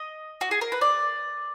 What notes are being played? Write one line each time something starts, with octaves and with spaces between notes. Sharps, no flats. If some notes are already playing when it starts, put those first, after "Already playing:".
Already playing: D#5
F#4
G#4
A#4
B4
D5